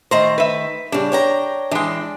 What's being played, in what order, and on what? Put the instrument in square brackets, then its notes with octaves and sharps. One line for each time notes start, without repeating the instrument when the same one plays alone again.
[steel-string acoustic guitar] D#3 A3 A#5 [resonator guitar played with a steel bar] C5
[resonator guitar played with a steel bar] B4 E5
[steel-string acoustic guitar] C#3 G3 [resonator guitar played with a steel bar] D4
[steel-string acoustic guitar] C#5 G5 A#5
[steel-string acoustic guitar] E3 G5 [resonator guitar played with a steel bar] G#3 D4